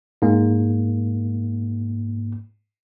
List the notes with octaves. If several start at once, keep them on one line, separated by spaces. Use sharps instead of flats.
G#2 A#3